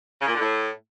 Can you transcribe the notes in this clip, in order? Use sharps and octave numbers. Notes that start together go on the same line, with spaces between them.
C#3
A#2
D3
A2